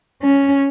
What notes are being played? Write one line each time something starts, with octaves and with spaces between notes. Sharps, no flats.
C#4